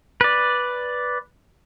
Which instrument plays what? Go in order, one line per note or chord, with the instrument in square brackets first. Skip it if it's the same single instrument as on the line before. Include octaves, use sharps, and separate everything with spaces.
[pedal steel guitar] B4 D5